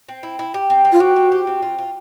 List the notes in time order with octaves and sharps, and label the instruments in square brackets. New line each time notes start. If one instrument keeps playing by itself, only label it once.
[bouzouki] C4
E4
E4
G4
C4
C4
[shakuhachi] F4
[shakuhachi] F#4 [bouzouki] G4
[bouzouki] C4
G4
C4
F4
F4